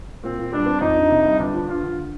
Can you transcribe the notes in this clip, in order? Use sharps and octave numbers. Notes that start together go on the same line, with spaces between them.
A#2 C4
A#2
G3 D4
C4
F2 D#4
D4
C3
G3
G1 D4
F3
G2 F4
D3